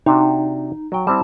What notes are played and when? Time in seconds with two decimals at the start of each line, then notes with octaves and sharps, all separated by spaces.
0.06 C3 D4 D#4 F#4
0.92 F#3 G5
1.07 G3 C4 E4 A5